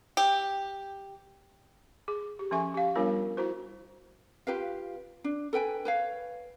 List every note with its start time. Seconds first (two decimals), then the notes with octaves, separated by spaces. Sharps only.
0.17 G4
2.08 G#4
2.39 G4
2.51 F3 C#4 A4 E5 G#5 C#6
2.74 G4 F5
2.96 G3 B3 D4 F4 A#4
3.37 E4 F#4 C5
4.47 F4 G4 B4 F5
5.24 D4
5.53 A4 B4 G5 G#5
5.85 B4 C#5 F5